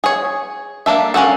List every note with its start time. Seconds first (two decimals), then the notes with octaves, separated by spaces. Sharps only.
0.04 G#4 C#5
0.86 A#3 D4 A4 E5
1.14 A#3 C#4 D#4 F#4 A4